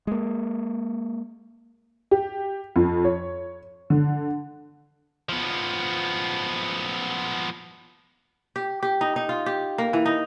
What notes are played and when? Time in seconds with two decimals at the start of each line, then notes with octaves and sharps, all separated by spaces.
0.07 G#3 A#3
2.11 G4
2.76 F2
3.04 C#5
3.90 D3
5.29 F3 B3
8.56 G4
8.83 G4
9.01 D#4
9.16 D#4
9.29 F4
9.46 G4
9.78 A#3
9.93 E3
10.06 D#4